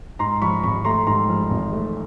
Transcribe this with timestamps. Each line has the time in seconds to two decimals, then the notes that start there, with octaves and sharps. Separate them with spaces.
0.19 G#2 A#5 C6
0.42 F3 B5 C#6
0.63 G#1 B5 C#6
0.85 A3 A#5 C6
1.07 G#2 A#5 C6
1.29 F3
1.51 G#1
1.73 A3